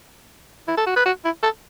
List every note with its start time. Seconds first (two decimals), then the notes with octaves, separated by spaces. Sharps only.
0.68 E4
0.77 A4
0.86 F#4
0.96 B4
1.06 F#4
1.24 E4
1.43 A4